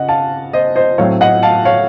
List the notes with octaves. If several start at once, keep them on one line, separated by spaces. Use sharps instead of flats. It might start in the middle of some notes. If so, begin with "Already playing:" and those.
Already playing: C#3 D#5 F#5
F5 A5
C5 D#5
C5 D#5
A2 F#3 C4 C#5 F5
D#5 F#5
F5 A5
C#5 F5